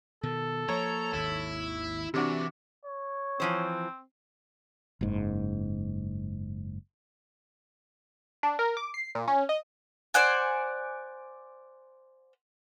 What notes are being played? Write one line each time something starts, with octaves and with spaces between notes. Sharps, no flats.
B2 D#3 A4
F3 A#3 C#5 A#5
G#1 D#2 E4
C3 E3 D4 F#4
C#5
E3 F3 C4 C5
F#1 G#2
D4
A#4
D6
C7
A#2
C#4
D#5
C5 D5 F#5 G#5